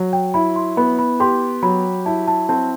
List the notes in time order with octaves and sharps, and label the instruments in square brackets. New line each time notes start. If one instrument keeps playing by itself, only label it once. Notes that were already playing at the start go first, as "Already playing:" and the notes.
Already playing: [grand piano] F#3
[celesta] G5
[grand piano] E4 [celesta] B5
[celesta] C6
[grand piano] B3 [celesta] B5
[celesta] B5
[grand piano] G4 [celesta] C6
[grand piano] F#3 [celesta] B5
[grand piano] E4 [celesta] A5
[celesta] A5
[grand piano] C4 [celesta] A5